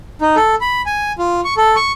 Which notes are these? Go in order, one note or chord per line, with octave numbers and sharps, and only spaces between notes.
D#4
A4
B5
G#5
F4
C#6
A4
C#6